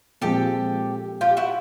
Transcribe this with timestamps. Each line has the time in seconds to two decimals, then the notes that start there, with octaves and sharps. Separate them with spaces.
0.21 A#2 F3 G#3 C4 G4 A4
1.21 F4 G4
1.37 E4 F#4